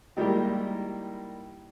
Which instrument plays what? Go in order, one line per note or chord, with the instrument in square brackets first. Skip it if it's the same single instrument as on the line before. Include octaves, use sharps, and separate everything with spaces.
[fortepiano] D#3 G3 G#3 A#3 E4 G4